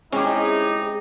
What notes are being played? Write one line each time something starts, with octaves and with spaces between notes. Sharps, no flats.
G#3 C4 C#4 D#4 E4 G4 G#4